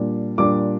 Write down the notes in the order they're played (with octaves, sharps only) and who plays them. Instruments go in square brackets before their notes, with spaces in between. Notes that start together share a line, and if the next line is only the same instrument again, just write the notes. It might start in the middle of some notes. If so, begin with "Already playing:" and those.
Already playing: [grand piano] A#2 G3 D4
A#2 G3 D4 D6